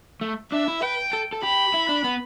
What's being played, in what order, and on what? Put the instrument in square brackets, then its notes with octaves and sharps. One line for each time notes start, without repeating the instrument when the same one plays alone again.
[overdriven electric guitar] A3
[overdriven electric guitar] D4 [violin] E5
[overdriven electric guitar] E4
[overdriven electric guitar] B4 [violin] G5
[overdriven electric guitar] A4
A4
[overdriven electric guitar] G4 [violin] B5
[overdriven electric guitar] E4
D4
B3